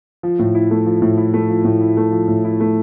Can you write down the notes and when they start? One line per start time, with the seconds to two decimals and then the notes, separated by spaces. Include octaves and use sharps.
0.23 F3
0.39 A2
0.55 E4
0.71 A3
0.86 F3
1.02 A2
1.17 E4
1.34 A3
1.50 F3
1.65 A2
1.81 E4
1.97 A3
2.12 F3
2.28 A2
2.45 E4
2.60 A3